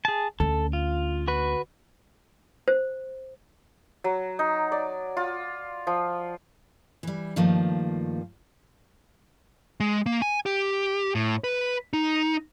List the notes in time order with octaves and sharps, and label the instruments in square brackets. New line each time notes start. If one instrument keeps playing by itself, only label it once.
[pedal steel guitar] G#4 A5
[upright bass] D2 C#4 [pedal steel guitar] A4
[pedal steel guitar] F4
F#4 B4
[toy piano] C5
[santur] F#3
D#4
D5
F4
F3
[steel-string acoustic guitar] E3 G3
G2 D#3 F3 A3 A#3
[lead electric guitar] G#3
A#3
G#5
G4
A2
B4
D#4